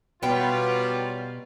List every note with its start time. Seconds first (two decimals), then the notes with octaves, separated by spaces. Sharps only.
0.23 B2 F#3 G3 B3 F4 G5